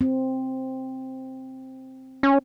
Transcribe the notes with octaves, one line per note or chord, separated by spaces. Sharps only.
C4
C#4